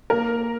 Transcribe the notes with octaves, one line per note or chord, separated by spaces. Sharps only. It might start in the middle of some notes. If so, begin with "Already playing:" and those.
A#3 A#4